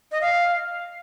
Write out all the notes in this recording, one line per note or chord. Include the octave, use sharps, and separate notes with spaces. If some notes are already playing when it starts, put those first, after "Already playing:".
D#5
F5